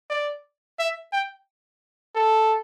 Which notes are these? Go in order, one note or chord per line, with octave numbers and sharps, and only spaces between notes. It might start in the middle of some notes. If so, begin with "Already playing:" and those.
D5
E5
G5
A4